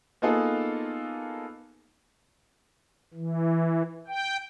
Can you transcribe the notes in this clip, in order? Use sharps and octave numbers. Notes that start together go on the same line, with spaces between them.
A#3 B3 D#4 F4 G#4 A4
E3
G5